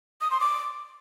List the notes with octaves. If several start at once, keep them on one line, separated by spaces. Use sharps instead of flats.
D#6
C6
D6